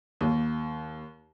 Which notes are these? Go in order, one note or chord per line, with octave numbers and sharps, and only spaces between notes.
D#2